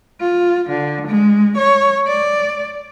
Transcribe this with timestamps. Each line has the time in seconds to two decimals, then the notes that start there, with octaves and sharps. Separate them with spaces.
0.21 F4
0.69 D3
1.07 G#3
1.57 C#5
2.07 D5